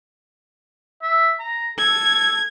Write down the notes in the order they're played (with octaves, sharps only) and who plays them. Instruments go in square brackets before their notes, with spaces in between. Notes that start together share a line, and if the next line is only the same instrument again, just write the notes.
[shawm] E5
A#5
[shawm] A4 [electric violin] G#6